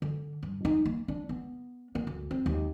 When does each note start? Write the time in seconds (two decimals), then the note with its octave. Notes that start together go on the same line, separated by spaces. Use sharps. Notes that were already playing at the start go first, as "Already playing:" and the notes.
0.02 D3
0.43 G2
0.65 D#4
0.86 A#3
1.08 D4
1.29 B3
1.95 A#3
2.07 D2
2.31 C4
2.46 D#2